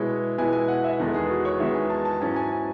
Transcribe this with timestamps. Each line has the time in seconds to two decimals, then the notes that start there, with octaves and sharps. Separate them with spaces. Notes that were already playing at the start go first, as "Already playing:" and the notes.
Already playing: B2 G#3 B3 E4 C#5
0.38 B2 G#3 B3 E4 G#5
0.52 G#5
0.68 F#5
0.84 E5
0.99 E2 D#3 G#3 B3 A4
1.14 G#4
1.30 F#4
1.45 C#5
1.60 E2 D#3 G#3 B3 E5
1.75 G#5
1.90 A5
2.05 A5
2.21 G#2 F#3 C#4 E4 A5
2.36 G#5
2.52 G#5